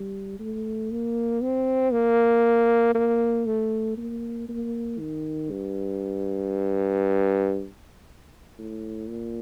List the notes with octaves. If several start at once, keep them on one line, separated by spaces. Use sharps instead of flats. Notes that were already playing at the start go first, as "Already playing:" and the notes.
Already playing: G3
A3
A#3
C4
A#3
A#3
A3
A#3
A#3
D#3
G2
A2
A#2